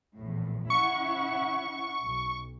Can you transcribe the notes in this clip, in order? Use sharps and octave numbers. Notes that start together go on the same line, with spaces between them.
A#1 E2 A2
C#4 E4 F#5 C#6
B1